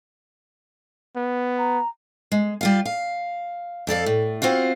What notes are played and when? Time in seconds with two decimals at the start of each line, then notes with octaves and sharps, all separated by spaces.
1.16 B3
1.58 A#5
2.32 G#3
2.61 G3 F4 F5
2.85 F5
3.87 F2 A4 D5 F5
4.06 A2
4.42 C4 F4 F#4 F5